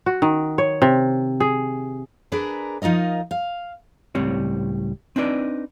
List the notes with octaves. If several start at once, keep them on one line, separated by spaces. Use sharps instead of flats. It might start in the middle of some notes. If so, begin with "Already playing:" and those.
F#4
D#3
C#5
C3
G#4
D4 G#4 A#4 B4 D5
F3 D#4 F4 A#4 D#5
F5
C#2 A2 G3 C4 C#5
C4 D4 D#4 B4 D5